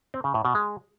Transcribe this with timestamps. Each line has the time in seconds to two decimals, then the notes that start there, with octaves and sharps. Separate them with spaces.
0.14 C4
0.24 C#3
0.34 A2
0.45 B2
0.55 G#3